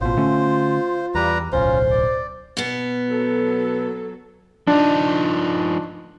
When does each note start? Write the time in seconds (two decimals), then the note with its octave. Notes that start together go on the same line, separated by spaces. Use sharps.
0.01 A1 B2 F4 C5
0.17 D3 A3 C#4
1.15 E2 G3 B4 A#5
1.53 D1 B1 C#4 F4 C5
1.91 D5
2.57 B2 B3
3.07 F#3 A4
4.67 F3 D4 D#4